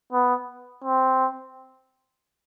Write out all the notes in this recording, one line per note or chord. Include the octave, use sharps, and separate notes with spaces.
B3
C4